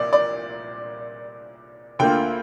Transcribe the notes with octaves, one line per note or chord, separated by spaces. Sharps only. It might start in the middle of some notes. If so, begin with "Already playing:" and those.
Already playing: C2 A#2 D5
D5
D2 D3 A#3 F4 G5